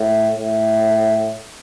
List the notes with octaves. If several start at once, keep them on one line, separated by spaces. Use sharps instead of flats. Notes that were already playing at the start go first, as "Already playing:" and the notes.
Already playing: A2
A2